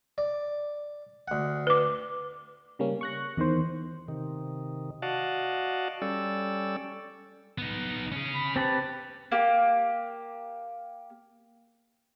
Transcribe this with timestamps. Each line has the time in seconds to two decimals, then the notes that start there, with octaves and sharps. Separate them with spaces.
0.18 D5
1.28 D2 F#5
1.67 B4 D6
2.79 C#3 G3 A#3 C#4
3.01 C#6 F#6 A#6
3.37 E2 D#3 C5
4.08 C3 D#3
5.02 F#4 D5 D#5 F5 F#5 A5
6.02 G3 C#4 A4 D5 E6
7.58 B3 D#4
8.12 C#4 G#4
8.35 B5
8.56 C4 G4 B4 A5
9.32 A#3 G4